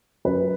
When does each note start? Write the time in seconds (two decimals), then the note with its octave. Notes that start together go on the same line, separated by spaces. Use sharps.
0.25 F#2 B4